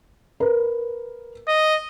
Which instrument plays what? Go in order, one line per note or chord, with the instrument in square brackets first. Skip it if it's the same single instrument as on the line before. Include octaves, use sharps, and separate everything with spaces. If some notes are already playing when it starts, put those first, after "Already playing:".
[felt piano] A#4 B4
[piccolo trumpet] D#5